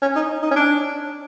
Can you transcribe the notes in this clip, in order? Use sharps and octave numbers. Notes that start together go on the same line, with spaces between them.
C#4
D#4
D#4
C#4
D4